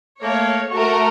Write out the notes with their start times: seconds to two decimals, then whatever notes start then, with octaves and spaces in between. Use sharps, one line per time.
0.22 A3 A#3 C#5
0.71 A3 F#4 A#4 C#6